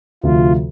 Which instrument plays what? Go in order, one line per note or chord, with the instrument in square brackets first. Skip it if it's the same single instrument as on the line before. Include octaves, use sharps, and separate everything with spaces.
[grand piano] D2 C3 F3 [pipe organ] F4